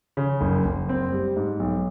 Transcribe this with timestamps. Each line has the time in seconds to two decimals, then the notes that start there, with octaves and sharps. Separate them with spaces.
0.17 C#3
0.41 F#1
0.65 F#1
0.89 C4
1.12 G3
1.36 G#2
1.60 B1